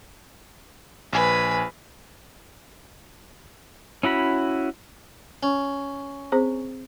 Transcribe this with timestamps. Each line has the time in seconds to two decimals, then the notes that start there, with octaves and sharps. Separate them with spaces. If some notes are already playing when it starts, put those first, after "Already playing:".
1.13 A#1 B4 G#5
4.03 C#4 E4 F#4 B5
5.43 C#4
6.32 C4 G#4 C5